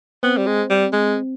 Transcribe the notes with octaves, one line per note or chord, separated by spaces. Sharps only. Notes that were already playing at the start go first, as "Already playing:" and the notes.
B3 C4
G3
G#3
G3
G#3